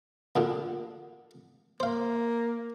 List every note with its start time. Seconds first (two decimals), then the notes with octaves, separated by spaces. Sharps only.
0.36 D2 A#2 D3
1.80 A#3 C5 F5